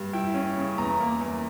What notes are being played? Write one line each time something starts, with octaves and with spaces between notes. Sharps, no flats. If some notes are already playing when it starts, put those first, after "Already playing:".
Already playing: G2
E4 G5
C#4
C#3
E2 A#5
A#3
E2